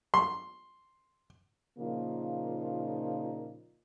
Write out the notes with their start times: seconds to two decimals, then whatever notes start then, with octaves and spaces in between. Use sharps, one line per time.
0.14 C6
1.79 A#2 C#3 F3 A#3 D#4 F4